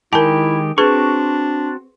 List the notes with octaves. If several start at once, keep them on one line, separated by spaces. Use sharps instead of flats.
D#3 G#3 E4 G4 A#4 G#5 A5
C4 D4 F#4 G#4 B4 C#6